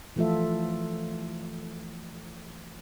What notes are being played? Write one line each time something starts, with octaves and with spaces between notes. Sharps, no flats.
E3 F3 A3 F4 A4 E5